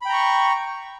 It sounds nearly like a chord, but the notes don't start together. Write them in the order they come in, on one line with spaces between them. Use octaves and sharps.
B5 G5 A#5 C#6